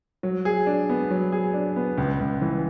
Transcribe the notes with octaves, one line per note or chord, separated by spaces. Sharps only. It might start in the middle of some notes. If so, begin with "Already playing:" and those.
F#3
G#4
D4
B3
F#3
G#4
D4
B3
C#2
C#2
E3